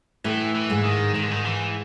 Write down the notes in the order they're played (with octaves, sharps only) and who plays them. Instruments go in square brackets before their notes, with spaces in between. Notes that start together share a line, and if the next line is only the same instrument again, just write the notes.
[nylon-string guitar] A2 A3 [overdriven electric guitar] E3
[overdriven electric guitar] E3
[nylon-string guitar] G#2 G#3
[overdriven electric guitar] D#3
[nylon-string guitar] G#2 G#3 [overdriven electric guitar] D#3
[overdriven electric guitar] D3
D#3
E3